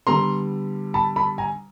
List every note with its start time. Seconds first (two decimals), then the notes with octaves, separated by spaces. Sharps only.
0.07 D3 G3 B3 A#5 C6
0.94 A5 B5
1.16 A5 B5
1.38 G#5 A#5